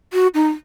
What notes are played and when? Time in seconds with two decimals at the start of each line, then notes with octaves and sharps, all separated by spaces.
0.13 F#4
0.34 D#4